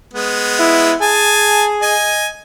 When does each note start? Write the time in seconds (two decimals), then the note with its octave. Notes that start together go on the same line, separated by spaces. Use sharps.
0.13 G#3 B3
0.59 E4
1.01 G#4 G#5 A5
1.82 D#5 G#5